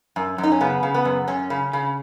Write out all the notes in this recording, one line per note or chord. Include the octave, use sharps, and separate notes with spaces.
F#2
F#2
D#4
C#4
C#3 B3
C#3
B3
F#2
F#2 C#4
C#3
C#3